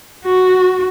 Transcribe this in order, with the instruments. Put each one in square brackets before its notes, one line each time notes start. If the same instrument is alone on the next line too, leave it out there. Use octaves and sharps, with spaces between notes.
[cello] F#4